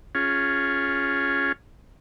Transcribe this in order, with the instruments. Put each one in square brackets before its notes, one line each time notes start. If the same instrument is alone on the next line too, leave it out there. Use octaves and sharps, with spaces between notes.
[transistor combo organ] C#4 F4 G#4